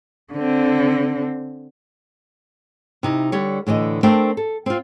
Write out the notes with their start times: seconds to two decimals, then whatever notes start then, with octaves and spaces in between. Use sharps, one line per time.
0.33 D3 C4
3.03 C3 D#4 E4
3.32 D3 G3 C#5
3.67 A2 D3 E3 D#5
4.03 A3 C4 D4 A#4 G5
4.37 A4
4.66 C4 F4